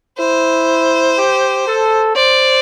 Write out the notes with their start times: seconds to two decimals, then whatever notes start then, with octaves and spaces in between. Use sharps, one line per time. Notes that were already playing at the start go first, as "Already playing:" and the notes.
0.19 E4 C5
1.17 G4
1.67 A4
2.16 C5 D5